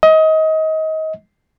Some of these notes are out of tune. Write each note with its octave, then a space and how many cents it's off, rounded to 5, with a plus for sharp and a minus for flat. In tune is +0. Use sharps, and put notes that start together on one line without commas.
D#5 +25